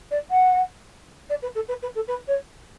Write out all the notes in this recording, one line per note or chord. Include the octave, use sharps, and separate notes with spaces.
D5
F#5
D5
B4
A4
B4
B4
A4
B4
C#5